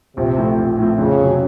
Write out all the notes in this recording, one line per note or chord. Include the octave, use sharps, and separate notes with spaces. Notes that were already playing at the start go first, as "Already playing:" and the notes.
A#1 C3
A2 F3 A3 C4
A#1
A2 F3 A3 C4
F2 C#3
C3 F#3